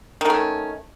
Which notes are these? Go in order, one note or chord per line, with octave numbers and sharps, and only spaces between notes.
D#3 A3 C#4